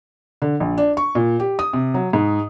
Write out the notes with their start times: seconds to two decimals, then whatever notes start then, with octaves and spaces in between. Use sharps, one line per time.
0.42 D3
0.60 A#1
0.78 D4
0.97 C#6
1.15 A#2
1.40 G4
1.59 D#6
1.73 C3
1.94 F#3
2.13 G#2